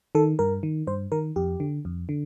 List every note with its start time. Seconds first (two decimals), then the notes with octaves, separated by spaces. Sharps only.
0.15 D#3 A4
0.39 G2 A#4
0.63 D#3
0.87 G2 C5
1.12 D#3 A#4
1.36 F2 G4
1.60 D3
1.85 F2
2.09 D3